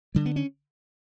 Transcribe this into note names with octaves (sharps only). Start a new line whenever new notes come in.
D3 G3
B3
C#4